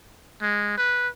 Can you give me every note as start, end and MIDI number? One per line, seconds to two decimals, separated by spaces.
0.42 0.74 56
0.78 1.08 71